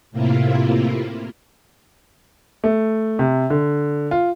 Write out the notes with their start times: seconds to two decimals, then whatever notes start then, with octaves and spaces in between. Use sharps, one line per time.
0.11 A2 C3 A#3 E4 F4
2.64 A3
3.19 C3
3.50 D3
4.11 F4